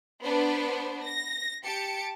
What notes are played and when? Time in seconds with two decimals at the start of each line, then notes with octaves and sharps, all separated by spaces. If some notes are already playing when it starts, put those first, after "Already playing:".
0.23 B3 D4 B4 C5
1.04 A#6
1.64 G4 A5 C#7 D7